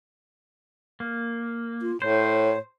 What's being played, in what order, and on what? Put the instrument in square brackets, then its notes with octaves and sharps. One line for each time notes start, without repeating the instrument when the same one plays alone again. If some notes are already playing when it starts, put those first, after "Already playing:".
[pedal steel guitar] A#3
[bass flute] F4
[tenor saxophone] A2 [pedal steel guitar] C5 [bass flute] C#5